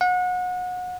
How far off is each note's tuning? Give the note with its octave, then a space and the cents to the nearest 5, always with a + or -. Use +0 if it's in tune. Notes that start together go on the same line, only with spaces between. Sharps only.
F#5 -30